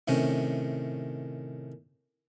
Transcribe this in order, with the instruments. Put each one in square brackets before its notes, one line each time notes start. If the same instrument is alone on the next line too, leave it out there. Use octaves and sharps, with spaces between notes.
[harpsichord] A2 C3 D#3 C#4